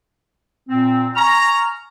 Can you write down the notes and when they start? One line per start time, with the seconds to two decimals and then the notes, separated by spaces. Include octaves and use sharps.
0.69 A#2 C4
1.16 G#5 A#5 C#6 F6